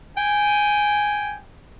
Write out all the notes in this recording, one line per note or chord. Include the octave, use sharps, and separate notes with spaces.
G5 G#5